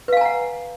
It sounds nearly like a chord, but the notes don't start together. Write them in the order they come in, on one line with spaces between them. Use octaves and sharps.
B4 F5 G#5 A#5 F#5